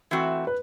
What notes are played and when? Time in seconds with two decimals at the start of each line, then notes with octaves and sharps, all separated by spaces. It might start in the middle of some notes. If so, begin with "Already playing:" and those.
0.11 E3 A3 C4 F#4
0.47 B4